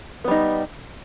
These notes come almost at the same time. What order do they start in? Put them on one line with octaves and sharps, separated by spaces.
B3 G3 D#4